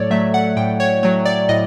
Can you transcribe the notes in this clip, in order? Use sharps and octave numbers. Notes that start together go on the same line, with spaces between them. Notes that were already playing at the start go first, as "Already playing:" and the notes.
Already playing: A2 F#3 A3 A4 C#5 D5
F#3 A3 E5
F#5
A2 G5
C#5
F#3 A3 C#5
D5
A2 D#5